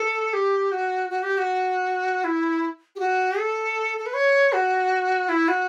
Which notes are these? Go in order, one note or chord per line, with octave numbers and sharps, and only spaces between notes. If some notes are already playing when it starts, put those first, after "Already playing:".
Already playing: A4
G4
F#4
F#4
G4
F#4
E4
G4
F#4
A4
A4
B4
C#5
F#4
E4
F#4